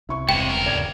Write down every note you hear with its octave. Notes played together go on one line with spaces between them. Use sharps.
C2 E4 C#6
E1 G2 C3 G5
C#2 A#4
D#2 G#2 D5 A#5 G#6